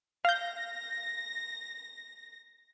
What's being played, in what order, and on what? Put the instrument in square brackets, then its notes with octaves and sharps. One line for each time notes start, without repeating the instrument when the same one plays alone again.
[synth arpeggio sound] F5 G6 [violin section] A#6